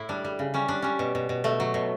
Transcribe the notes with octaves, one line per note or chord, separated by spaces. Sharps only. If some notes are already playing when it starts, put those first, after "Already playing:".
Already playing: A2 E4
G3 D4
G3
C#3
G3 C#4
G3 D4
G3 C#4
B2
B2
B2
B2 A3
F#3
B2